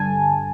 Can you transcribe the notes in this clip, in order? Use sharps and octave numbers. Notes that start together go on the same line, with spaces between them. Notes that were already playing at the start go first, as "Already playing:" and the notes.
Already playing: G2 D3 G#5 A5